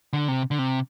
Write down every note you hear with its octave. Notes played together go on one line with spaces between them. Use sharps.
D3
C3
D3
C3